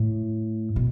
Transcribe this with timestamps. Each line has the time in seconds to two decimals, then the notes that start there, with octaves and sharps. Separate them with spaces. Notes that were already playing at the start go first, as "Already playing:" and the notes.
Already playing: A2
0.76 B2